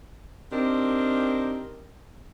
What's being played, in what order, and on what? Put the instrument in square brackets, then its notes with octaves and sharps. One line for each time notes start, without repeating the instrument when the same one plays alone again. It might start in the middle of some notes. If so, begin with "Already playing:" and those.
[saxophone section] C4 D4 D#4 G4 A#4